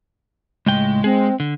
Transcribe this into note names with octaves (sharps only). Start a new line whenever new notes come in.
C#2 A2 G#3 G5
C4 G#4
D3